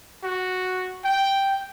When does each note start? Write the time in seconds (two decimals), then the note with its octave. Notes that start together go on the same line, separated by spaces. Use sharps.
0.24 F#4
1.04 G5